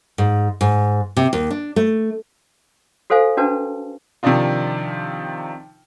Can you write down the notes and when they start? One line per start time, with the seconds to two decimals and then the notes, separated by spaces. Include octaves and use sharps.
0.18 G#2
0.61 G#2
1.17 C3
1.33 D#2
1.50 D4
1.76 A3
3.10 F#4 A4 C5 F5 G#5
3.37 C#4 D4 F#4 B4 A5
4.23 C3 D#3 F3 D4 D#4 F4